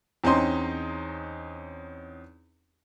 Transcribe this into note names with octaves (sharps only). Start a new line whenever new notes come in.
E2 C4 C#4 D#4 C6